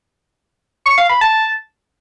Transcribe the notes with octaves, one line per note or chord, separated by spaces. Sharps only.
C#6
F5
B5
A5